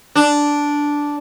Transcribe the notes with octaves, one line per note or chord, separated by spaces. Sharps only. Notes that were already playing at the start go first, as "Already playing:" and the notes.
D4